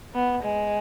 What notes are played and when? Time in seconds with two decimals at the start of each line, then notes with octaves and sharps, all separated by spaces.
0.14 B3
0.43 G#3